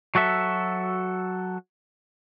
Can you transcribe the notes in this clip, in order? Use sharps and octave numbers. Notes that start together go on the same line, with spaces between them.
F#3 F#4 A4 E5